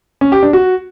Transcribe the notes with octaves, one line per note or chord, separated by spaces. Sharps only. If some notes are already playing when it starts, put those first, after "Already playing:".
C#4
G4
D4
F#4